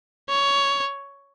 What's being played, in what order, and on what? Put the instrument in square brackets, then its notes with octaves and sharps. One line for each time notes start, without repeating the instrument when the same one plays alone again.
[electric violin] C#5